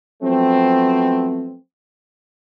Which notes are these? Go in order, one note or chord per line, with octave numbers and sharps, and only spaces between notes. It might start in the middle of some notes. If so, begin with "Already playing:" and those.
F3 F#3 A3 B3 C4